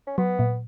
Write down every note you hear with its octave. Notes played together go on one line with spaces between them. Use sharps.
C#4
F#3 B3
A#2